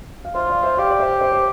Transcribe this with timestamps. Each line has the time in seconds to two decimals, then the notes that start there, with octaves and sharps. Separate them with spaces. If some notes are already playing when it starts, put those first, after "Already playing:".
0.25 F5
0.35 F4 C5 E5
0.50 D5 F5
0.63 C5 E5
0.74 E5
0.77 G4 D5 F5
0.91 D5
0.99 C5 E5
1.21 C5 E5
1.32 C5